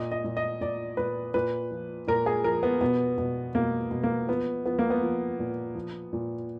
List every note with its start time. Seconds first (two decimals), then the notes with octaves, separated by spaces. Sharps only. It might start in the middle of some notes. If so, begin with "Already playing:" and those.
Already playing: A#2 D#5
0.12 D#5
0.24 A#2
0.37 D#5
0.61 A#2 D5
0.97 A#2 B4
1.34 A#2 B4
1.71 F3
2.07 A#2 A#4
2.26 G#4
2.44 F3 A#4
2.63 B3
2.81 B2 B3
3.18 B2
3.55 B2 A#3
3.91 B2
4.03 A#3
4.29 F3 B3
4.65 F3 B3
4.79 A#3
4.90 B3
5.02 F3
5.39 A#2
5.75 F3
6.13 A#2